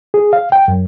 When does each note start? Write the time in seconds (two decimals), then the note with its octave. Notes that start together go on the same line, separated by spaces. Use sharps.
0.14 G#4
0.33 F5
0.52 G5
0.68 F#2